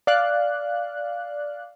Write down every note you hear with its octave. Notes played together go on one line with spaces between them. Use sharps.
D5 F5 F#6